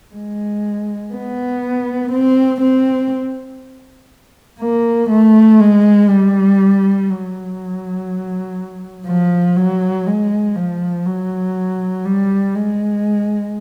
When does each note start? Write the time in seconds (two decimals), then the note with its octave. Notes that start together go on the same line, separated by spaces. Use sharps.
0.14 G#3
1.13 B3
2.12 C4
2.62 C4
4.61 A#3
5.10 A3
5.60 G#3
6.10 G3
7.09 F#3
9.07 F3
9.57 F#3
10.07 G#3
10.56 F3
11.06 F#3
12.05 G3
12.55 G#3